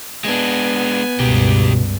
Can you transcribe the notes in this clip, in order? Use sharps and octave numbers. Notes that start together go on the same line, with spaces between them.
G#3 B3 D4 G#5
C#2 G2 B2 G4 A#4